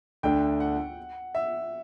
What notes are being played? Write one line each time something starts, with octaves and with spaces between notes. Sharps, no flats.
D2 D3 A3 D4 G5
F#5
E5